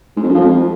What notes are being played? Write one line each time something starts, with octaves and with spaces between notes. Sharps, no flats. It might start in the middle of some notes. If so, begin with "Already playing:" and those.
G#2
F2
F#2
F3
F2